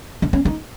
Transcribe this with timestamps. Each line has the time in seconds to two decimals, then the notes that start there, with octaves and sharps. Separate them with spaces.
0.22 D4
0.33 C#4
0.45 D#4